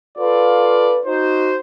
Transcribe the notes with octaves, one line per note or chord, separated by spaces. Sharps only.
F4 A4 B4 D5 F5
D#4 F#4 C5